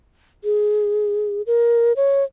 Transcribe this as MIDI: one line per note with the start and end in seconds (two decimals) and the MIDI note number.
0.44 1.42 68
1.47 1.93 70
1.96 2.24 73